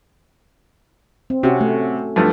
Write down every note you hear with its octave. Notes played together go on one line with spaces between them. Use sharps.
C4
C3 C#4 F#4
A3
G2 F3 A3